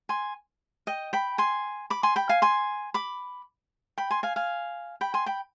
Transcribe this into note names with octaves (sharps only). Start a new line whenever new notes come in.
G#5 C6
D#5 G5
G5 B5
G#5 C6
B5 D6
G#5 C6
G5 B5
F5 G#5
G#5 C6
B5 D6
G5 B5
G#5 C6
F5 G#5
F5 G#5
G5 B5
G#5 C6
G5 B5